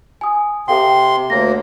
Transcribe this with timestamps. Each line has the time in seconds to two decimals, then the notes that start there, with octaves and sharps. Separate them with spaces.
0.21 G#5 D#6
0.68 C3 A4 F5 G5 C6
1.30 D2 A#3 C#5 A#6